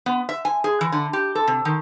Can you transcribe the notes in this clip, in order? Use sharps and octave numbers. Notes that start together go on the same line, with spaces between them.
B3
E5
G#5
G#4
E3
D3
G4
A4
C3
D#3